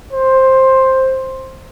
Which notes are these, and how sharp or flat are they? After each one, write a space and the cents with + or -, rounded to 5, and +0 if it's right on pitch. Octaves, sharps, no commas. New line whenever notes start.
C5 +10